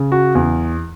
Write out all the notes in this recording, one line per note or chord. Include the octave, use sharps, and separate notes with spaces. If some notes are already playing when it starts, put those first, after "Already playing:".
Already playing: C#3
F#4
E2